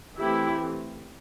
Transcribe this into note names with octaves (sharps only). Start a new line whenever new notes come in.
E3 A3 C4 E4 G4